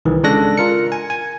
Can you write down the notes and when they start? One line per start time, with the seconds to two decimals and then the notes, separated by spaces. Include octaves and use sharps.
0.05 C2 D#3 E3
0.24 C#3 G#3 D4 A4 F#6 A#6
0.58 F4 A#4 C#7
0.92 G#5
1.10 G#5